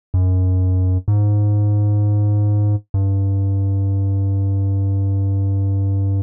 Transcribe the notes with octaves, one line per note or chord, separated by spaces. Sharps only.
F#2
G#2
G2